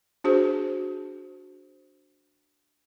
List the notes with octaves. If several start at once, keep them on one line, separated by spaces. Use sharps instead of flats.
D4 F#4 G#4 C5